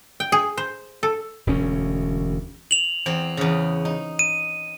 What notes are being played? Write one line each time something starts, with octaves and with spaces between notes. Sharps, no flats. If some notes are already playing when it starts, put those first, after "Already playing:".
G5
G#4
C5
A4
E1 D2 C#4
F7 F#7
E2 C4 G5
E2 C#3
D#4
D#7